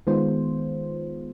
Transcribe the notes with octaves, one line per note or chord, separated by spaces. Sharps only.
D#3 G#3 B3 F4 C5